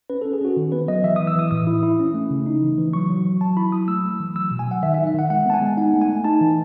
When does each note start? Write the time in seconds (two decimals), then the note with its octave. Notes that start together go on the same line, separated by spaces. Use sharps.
0.10 C#4 B4
0.22 C#4 A4
0.33 G#4
0.41 C#4 F#4
0.57 D#3
0.72 B3 B4
0.88 F#3 D#5
1.04 E3 E5
1.16 E3 D#6
1.27 E6
1.36 E3 D#6
1.51 A2 D#6
1.67 E4
1.83 E4
1.99 C#4
2.14 A3
2.30 C#3
2.46 D#4
2.62 E3
2.78 E3
2.93 F#3 C#6
3.09 F#3
3.25 F#3
3.41 F#3 A5
3.57 E4 B5
3.72 F#3 D#6
3.88 A3 E6
4.05 A3
4.20 E3
4.36 F#3 E6
4.51 B2
4.59 G#5
4.67 F#3 F#5
4.83 D#3 E5
4.94 E5
4.98 D#4
5.07 E5
5.14 D#3 F#5
5.30 G#3 F#5
5.46 B3 A5
5.54 G#5
5.62 G#3
5.77 D#4 F#5
5.93 A3
6.01 G#5
6.09 A3
6.24 D#4 A5
6.41 E3